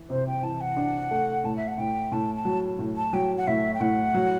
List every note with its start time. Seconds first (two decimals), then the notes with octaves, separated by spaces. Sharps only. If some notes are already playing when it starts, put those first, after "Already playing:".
Already playing: E3
0.09 C3 C5
0.26 G5
0.42 E3 A5
0.60 F#5
0.77 D4
1.11 A3
1.44 A2 A5
1.56 E5
1.67 F#5
1.78 A2 G5
2.12 A2 A5
2.35 A5
2.45 F#3
2.79 A2
2.96 A5
3.13 F#3 G5
3.37 F#5
3.47 A2 E5
3.74 G5
3.80 A2 F#5
4.14 F#3